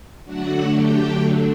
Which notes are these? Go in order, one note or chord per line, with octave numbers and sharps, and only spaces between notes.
D3 F#3 A3 D4 F#4 F#5
G4 G5